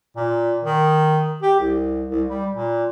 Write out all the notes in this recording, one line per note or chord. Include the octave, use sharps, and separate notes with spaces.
A#2
D#3
G4
C2
C2
G3
A#2